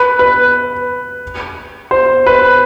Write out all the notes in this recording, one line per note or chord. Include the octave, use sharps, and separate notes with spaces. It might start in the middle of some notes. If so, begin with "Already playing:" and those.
Already playing: B4
B4
C5
B4